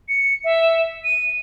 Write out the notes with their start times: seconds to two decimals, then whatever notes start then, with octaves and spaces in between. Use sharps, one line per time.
0.09 C#7
0.44 E5
1.04 D#7